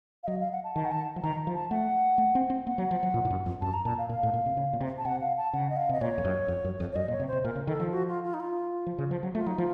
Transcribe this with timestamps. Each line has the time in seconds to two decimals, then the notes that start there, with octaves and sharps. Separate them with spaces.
0.23 F5
0.27 F#3 D#5
0.40 F5
0.52 F#5
0.64 A5
0.75 D#3 A5
0.85 F#5
0.91 A5
1.16 F3
1.23 D#3 A#5
1.47 F3
1.55 A5
1.70 A3 F#5
2.18 A3
2.35 C4
2.50 C4
2.67 A#3 F#5
2.78 F#3
2.91 F3
3.03 F#3
3.14 A#2
3.25 A2
3.30 F#2
3.46 F2
3.62 F#2 A5
3.73 A#5
3.85 A#2 A5
3.98 F5
4.09 A#2 F5
4.23 A2
4.34 A#2
4.46 C3
4.57 C#3
4.73 A#2
4.81 C3
4.98 A5
5.05 C3 F#5
5.21 F5
5.37 A5
5.53 C#3 F#5
5.70 D#5
5.76 F5
5.89 C3 D#5
6.01 A#2 C#5
6.18 F2
6.25 F#2
6.48 F2
6.65 F#2
6.80 F2
6.92 C#5
6.95 F#2 D#5
7.08 A#2
7.12 C#5
7.20 C3
7.27 C5
7.32 C3
7.44 A#2 A#4
7.56 C#3
7.67 D#3 A4
7.80 F3
7.91 F#4
8.08 F4
8.24 F4
8.34 D#4
8.40 F4
8.86 F3
8.98 C#3
9.11 F3
9.23 F#3
9.35 A3 F4
9.46 F#3 D#4
9.58 F3 F4